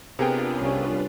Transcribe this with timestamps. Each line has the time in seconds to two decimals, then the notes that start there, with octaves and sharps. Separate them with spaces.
0.19 C3 B3 D4 F4 G#4 A#4 B4 G5
0.56 C2 G3 C#4